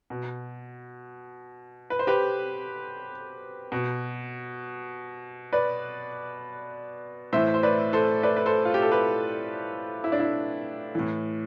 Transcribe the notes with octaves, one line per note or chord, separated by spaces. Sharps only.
B2
B4
C5
G4 B4
B2
B4 D5
A2 E3 C5 E5
C5
B4 D5
A4 C5
B4 D5
B4
A4 C5
F4
G4
A4
G4 B4
E4
D4
E4
A2 E3